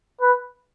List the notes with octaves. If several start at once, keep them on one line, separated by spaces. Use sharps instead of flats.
B4